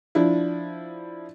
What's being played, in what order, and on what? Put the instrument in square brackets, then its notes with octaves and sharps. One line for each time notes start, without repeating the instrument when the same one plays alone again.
[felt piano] F3 D4 E4